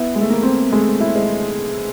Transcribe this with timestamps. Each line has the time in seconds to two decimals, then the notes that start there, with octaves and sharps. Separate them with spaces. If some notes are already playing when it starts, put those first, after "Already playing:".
Already playing: B3 E4
0.15 G#3
0.21 A3
0.30 A#3
0.43 C4
0.72 G#3 A3
1.00 E4
1.16 G#3